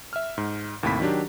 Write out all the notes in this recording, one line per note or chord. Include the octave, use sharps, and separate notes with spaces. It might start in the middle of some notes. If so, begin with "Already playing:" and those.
E5 F6
G#2
D#2 A2 C3 C4 B5 B6
D#3 F#3 D4 G4